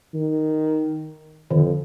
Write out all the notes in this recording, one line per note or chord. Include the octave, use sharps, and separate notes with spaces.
D#3
F2 D3 D#3